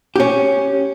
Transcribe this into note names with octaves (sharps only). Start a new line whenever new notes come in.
C#4 G4